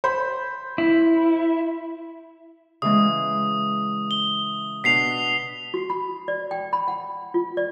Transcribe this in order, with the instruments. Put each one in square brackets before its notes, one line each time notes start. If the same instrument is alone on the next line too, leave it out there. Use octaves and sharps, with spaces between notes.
[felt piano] C5 B5
[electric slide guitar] E4
[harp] C#3 E3 G#3 [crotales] D#6
[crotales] G7
[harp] B2 D4 B4 [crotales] B6 C7 F7
[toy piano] F#4
B5
D5
G5
B5
F#5
F4
D5